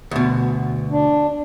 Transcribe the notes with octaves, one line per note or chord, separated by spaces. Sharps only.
D2 B2
D4